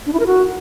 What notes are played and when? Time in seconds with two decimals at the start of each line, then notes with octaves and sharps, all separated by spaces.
0.06 D4
0.13 E4
0.20 A#4
0.26 F#4